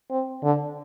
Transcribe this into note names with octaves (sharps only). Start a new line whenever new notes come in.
C4
D3